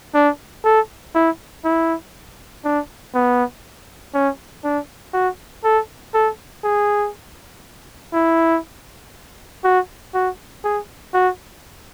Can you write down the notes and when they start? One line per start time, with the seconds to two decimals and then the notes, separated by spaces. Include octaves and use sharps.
0.14 D4
0.65 A4
1.15 E4
1.65 E4
2.64 D4
3.14 B3
4.14 C#4
4.64 D4
5.14 F#4
5.64 A4
6.14 A4
6.64 G#4
8.14 E4
9.64 F#4
10.14 F#4
10.64 G#4
11.14 F#4